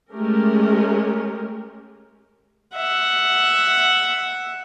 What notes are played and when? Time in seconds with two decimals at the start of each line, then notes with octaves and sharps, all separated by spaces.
0.13 G#3 A3 C#4 G4 A#4
2.76 E5 F#5